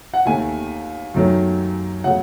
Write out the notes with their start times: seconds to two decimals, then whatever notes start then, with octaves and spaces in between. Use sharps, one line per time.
0.14 F#5
0.25 D#2 D#3 A3 G#5
1.14 F#2 D#3 F#3 A3
2.04 C#3 F#3 A3 F#5